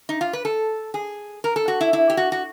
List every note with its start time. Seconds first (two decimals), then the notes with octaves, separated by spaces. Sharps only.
0.09 D#4
0.21 F4
0.33 B4
0.45 A4
0.94 G#4
1.44 A#4
1.56 A4
1.68 F#4
1.81 E4
1.93 E4
2.10 G4
2.17 F#4
2.32 F#4